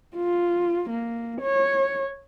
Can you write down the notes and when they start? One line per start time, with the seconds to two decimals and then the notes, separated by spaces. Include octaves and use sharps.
0.17 F4
0.90 A#3
1.41 C#5